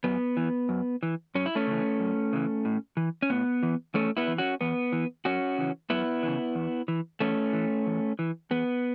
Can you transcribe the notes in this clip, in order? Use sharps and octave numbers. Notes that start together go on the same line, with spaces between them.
F#2 B3
E3
F#2
E3
F#2 C#4
E4
A3 C#4
C#3 E3
F#2
C#3 E3
A2
E3
C#4
A2 B3
E3
E2 A3 C#4
B3 E4
E3
C#4 F#4
E2 B3
E3
F#2 C#4 F#4
C#3 E3
F#2 B3 E4
C#3 E3
E2
E3
E2 A3 C#4
E3
E2
E3
E2 B3